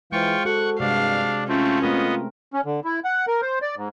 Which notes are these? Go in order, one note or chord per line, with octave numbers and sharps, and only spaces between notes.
E3 G#3 F4 C5 G5 C#6
F#4 A4 F#5 C#6
G2 C3 G#3 D4 F5
A3 C4 C#4 F4
A3 B3 C4 F4 A#4 D#5
C#4
D3
E4
F#5
A#4
C5
D5
G#2